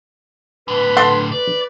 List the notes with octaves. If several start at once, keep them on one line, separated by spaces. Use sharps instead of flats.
A2 D3 B4
A4 F#5 C6
B4 D5